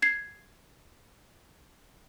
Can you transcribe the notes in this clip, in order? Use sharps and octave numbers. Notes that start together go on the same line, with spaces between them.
G#6 C7